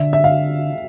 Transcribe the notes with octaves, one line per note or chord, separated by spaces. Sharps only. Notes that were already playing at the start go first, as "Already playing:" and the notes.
Already playing: D3 E5
E5
F5